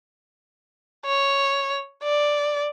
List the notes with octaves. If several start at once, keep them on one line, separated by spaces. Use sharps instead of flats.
C#5
D5